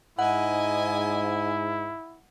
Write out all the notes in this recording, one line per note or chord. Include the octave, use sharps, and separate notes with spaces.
G#2 E4 D#5 F#5 G#5